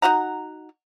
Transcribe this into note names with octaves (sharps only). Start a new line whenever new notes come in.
D#4 F#4 F#5 A#5